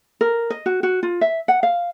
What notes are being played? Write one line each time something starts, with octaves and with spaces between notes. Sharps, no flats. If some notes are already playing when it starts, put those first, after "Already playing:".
A#4
D#5
F#4
F#4
F4
E5
F#5
F5